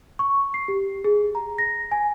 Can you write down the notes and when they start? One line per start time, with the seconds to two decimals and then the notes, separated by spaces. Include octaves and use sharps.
0.19 C#6
0.54 C7
0.68 G4
1.04 G#4
1.35 A#5
1.58 A#6
1.91 G#5